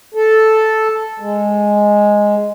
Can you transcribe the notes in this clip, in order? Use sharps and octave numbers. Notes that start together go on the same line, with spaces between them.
A4
G#3